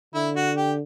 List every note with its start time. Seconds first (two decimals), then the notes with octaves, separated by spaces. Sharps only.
0.14 D3 E4
0.36 F#4
0.57 G4